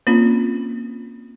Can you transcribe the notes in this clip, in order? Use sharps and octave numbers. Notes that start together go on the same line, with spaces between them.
A#3 C4 C#4 F4